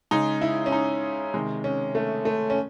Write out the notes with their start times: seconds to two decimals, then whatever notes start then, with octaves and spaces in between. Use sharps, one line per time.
0.11 C#3 G#3 D#4
0.42 E4
0.66 C#4
0.72 D#4
1.34 C3 D#3 G#3
1.64 C#4
1.95 A3
2.25 A3
2.50 C#4